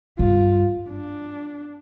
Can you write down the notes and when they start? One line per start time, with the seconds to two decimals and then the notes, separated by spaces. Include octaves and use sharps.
0.19 G2 F4
0.90 D4